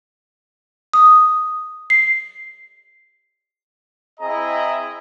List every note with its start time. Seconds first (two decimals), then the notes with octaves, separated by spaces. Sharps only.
0.94 D#6
1.90 C7
4.20 C4 E4 G#4 D#5 A#5